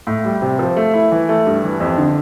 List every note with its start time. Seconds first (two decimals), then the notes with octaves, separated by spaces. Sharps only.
0.07 A2
0.25 G3
0.42 C3
0.59 F3
0.76 A3
0.94 E4
1.12 E3
1.29 A3
1.47 G2
1.64 E3
1.80 F2
1.98 D3